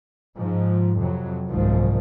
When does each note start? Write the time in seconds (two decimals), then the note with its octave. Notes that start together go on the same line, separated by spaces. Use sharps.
0.37 G#2 F3
0.98 F2 C3 F#3
1.49 F#1 C2 G#2 D#3 F3